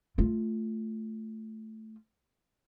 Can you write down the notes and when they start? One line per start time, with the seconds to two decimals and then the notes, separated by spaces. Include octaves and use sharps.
0.18 A3 F4